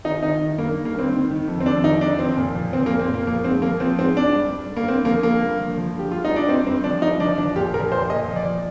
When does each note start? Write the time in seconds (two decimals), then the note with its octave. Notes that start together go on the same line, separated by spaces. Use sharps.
0.04 D#3 D#4
0.23 D#3 D#4
0.41 D#3
0.58 G2 A#3
0.77 D#3
0.85 A#3
0.95 G2 C4
1.12 D#3
1.31 D#3
1.48 F2
1.60 C4
1.66 F2 D4
1.84 D#3 D#4
2.01 F2 D4
2.19 F3 C4
2.37 A#2
2.55 F3
2.73 F3 C4
2.86 A#3
2.91 A#2
3.00 C4
3.09 A#2 A#3
3.27 F3 A#3
3.44 G#2 C4
3.62 F3 A#3
3.80 F3 C4
3.98 G#2 C4
4.16 G#2 D4
4.34 G2
4.52 G2
4.70 D3
4.76 A#3
4.88 D3 C4
5.05 F3 A#3
5.23 D3 A#3
5.41 G2
5.60 F3
5.77 F3
5.95 D3 G4
6.12 G2 F4
6.25 D#4
6.31 G2 D4
6.48 G2 C4
6.67 G2 C4
6.84 F3 D4
7.02 G2 D#4
7.20 F3 D4
7.38 F3 D4
7.56 A#2 G4
7.74 F3 A#4
7.92 A#2 C5
8.09 A#2 D#5
8.28 F3
8.36 D5
8.45 F3